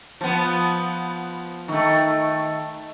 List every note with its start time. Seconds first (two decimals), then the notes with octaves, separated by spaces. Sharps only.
0.21 F3 B3
1.68 D#3 A3